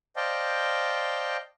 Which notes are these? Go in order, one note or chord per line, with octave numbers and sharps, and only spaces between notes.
C5 D5 D#5 F5 G5 A5